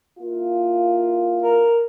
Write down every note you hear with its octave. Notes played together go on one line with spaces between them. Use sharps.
A#3 E4 F4
A#4